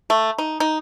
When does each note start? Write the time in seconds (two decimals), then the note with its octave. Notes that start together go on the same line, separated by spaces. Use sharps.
0.10 A3
0.38 D#4
0.60 D#4